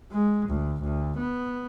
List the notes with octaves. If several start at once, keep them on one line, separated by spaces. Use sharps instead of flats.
G#3
D2
D2
B3